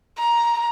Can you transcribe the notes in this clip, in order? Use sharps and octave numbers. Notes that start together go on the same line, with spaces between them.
A#5